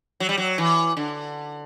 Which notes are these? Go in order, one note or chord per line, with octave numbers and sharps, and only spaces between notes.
F#3
G3
F#3
E3
D3